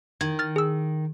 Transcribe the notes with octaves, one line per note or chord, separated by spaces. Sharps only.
D#3 G#6
F6 A6
G#4 E6